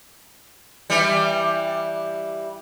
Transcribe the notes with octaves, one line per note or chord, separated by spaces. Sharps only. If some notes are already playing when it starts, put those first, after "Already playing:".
E3 G3